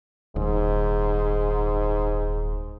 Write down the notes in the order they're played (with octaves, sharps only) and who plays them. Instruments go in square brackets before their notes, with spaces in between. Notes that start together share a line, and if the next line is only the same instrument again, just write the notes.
[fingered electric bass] D#1 [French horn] G#2